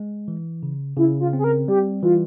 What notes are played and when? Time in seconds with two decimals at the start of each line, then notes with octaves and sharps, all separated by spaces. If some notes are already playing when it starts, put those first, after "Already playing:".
Already playing: G#3
0.28 E3
0.63 C#3
0.97 C#3 E4
1.20 F4
1.33 C4
1.39 G#4
1.44 A#4
1.68 G3 G4
2.02 E3 F4